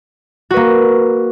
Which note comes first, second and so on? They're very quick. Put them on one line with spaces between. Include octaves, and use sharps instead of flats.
F#4 B4 A#3